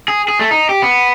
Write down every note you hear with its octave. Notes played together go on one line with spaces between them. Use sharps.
G#4
G#4
A3
D#4
G4
B3